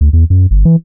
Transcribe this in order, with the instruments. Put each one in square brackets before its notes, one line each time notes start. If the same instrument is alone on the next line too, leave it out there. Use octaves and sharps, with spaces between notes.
[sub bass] D2
E2
F#2
G1
E3